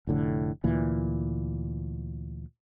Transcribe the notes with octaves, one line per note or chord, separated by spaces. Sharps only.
F1 A2 D3
D2 A#2 E3